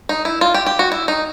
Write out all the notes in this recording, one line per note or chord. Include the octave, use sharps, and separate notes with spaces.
D#4
E4
F4
G4
G4
F#4
E4
D#4